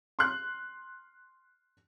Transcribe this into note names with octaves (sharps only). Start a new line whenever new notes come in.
C6 F6 F#6